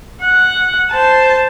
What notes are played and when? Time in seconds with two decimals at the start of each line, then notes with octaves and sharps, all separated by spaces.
0.22 F#5
0.91 C5 A5